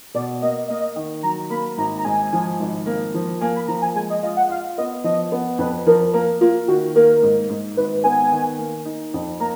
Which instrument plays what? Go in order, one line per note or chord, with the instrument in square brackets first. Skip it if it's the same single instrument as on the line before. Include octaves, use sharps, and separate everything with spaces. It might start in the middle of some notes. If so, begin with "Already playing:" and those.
[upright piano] B2 [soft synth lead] D5
[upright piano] A#3 [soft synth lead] D#5
[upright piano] A#3 [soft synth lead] D#5
[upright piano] D#3
[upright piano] F#3 [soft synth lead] A#5
[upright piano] A#3 [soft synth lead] B5
[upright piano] G#1 [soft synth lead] A#5
[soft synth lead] A#5
[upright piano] G#2 [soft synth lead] G#5
[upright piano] F3
G#1
A#3
F3
[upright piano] A#3 [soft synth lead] G#5
[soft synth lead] B5
[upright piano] F3 [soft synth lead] A#5
[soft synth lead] G#5
[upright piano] G#3 [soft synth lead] G#5
[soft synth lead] D#5
[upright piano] F4 [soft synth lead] D#5
[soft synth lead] F#5
[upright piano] F4 [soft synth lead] F5
[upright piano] B3 [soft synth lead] D#5
[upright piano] F3 [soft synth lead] D#5
[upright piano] B3
[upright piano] F2 [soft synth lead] B4
[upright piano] F3 [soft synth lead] A#4
[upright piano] A#3 [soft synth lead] A#4
[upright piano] A#3 [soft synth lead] F4
[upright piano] D#3 [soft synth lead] F#4
[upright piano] A#3 [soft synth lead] A#4
[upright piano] G#2
G#2
[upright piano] G#1 [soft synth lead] B4
[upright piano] B3 [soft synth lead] G#5
[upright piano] D#3
A#3
D#4
F2
[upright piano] A#3 [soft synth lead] A#5